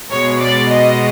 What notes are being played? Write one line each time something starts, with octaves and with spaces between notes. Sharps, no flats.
B2 G#3 C#5
D5
D#5